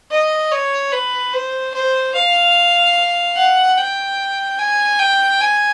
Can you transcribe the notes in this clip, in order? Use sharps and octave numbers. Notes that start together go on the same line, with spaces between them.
D#5
C#5
B4
C5
C5
F5
F#5
G5
G#5
G5
G#5